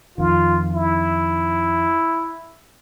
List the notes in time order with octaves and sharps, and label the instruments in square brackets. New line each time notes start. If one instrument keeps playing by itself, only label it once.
[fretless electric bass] F2 D#3 [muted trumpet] F4
[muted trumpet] E4